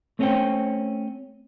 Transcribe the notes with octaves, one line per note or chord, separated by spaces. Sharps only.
A3 C4 C#4 C#5 G5